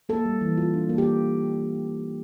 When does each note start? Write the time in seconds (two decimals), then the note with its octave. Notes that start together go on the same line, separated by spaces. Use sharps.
0.09 A#3 A4
0.25 G3
0.41 E3
0.57 F4
0.74 D4
0.89 A#3
0.98 G4